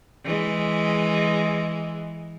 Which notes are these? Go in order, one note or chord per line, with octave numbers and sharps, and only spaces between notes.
E3 G#3